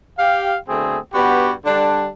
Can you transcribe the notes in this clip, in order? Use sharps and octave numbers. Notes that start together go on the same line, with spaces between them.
G4 F5
B2 D3 A3 C4 G#4
G2 B3 F#4 G4 B5
D3 G3 D4